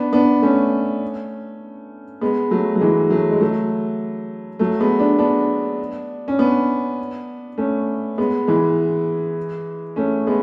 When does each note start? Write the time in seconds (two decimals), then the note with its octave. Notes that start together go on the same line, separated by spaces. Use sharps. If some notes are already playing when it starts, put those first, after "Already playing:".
Already playing: B3 D4
0.13 B3 D4
0.42 A3 C#4
2.21 G#3 B3
2.51 F#3 A3
2.76 F#3
2.81 E3 G#3
3.10 F#3 A3
3.31 G#3
3.41 F#3 A3
4.59 F#3 A3
4.80 G#3 B3
4.99 D4
5.19 B3 D4
6.28 C#4
6.39 B3 D4
7.58 A3 C#4
8.18 G#3 B3
8.47 E3 G#3
9.96 A3 C#4
10.27 G#3 B3